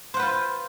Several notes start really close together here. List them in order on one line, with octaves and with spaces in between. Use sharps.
C5 F#5 B4 F4